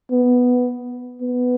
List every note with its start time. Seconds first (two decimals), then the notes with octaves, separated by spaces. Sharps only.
0.11 B3
1.21 B3